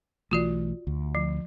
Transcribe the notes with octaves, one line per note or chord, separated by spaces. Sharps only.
B1 E3 A3 F4 F#4 D5
D2
F3